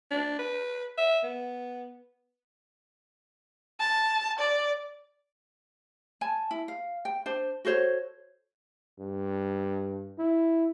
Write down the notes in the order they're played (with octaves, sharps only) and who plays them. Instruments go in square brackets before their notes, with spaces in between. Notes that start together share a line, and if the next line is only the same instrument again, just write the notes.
[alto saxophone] D4
B4
E5
B3
[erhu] A5
D5
[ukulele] G#5 A5
E4
F5
G5
D4 C5
F#4 A4 C5 C#5
[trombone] G2
E4